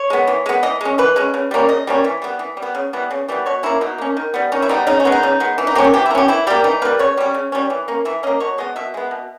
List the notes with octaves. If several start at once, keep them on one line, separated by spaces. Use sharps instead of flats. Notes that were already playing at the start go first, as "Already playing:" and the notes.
Already playing: C#5
G#3 B3
E3
G#3 B3
E3 D#5
G#3 C#4
E3 B4
G#3 C#4
C#3
G3 A#3 C#4
C#3 D#5
G3 A#3 C#4
E3
G3 B3
E3
G3
B3
C#3
E3 G3 B3
C#3
E3 G3 B3
B2 C#5
A#3 C#4 E4
B2 D#4
A#3 C#4
D#3
G3 B3
D#3 C#4
E4
G3 B3 D#4
C#3 D#4
C#4
G#3 B3
D#4
C#3
G#3 B3
E3
D#4
A#3 C#4 G4
G#4
E3 G4
A#3 E4
C#4 G4
E3 E4
G3 A#3 G4
E3 D#4
G3 A#3 B4
C#3 C#5
G3 C#4
C#3
G3 C#4
E3
A#3 C#4
E3 E5
A#3 C#4 D#5
B2 C#5
G#3 B3 D#5
B2 E5
G#3 B3
B2